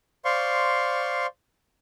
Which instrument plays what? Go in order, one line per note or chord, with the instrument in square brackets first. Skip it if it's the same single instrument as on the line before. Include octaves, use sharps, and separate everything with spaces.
[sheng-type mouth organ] C5 D5 F5 C6 C#6